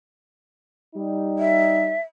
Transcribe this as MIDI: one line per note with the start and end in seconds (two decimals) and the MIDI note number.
0.96 1.94 55
0.96 1.94 63
1.39 2.01 76